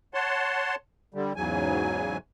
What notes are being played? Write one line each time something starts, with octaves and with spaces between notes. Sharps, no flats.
C#5 F#5 A5 C6
D3 G3
E2 G#2 C#3 F#3 G#5